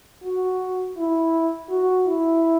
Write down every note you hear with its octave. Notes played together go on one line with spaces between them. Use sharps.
F#4
E4
F#4
E4